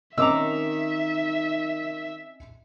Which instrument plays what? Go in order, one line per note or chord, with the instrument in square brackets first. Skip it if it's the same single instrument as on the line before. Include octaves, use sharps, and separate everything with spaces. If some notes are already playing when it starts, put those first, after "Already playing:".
[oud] D#3 [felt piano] C4 C#4 D#5 [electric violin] E5 [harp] A#5 D6 E6